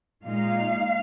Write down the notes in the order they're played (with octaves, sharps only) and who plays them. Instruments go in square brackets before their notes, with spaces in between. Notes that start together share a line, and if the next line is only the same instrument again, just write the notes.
[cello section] A#2 G#3 D#4 F5